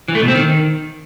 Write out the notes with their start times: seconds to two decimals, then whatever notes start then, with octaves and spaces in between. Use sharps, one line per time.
0.08 E3
0.15 A3
0.22 B2
0.28 C4
0.35 D#3